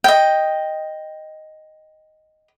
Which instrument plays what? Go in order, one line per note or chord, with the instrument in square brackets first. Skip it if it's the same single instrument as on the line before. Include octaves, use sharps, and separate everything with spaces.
[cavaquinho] D#5 G5